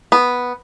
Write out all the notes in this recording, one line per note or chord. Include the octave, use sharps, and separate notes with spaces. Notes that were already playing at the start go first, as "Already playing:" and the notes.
B3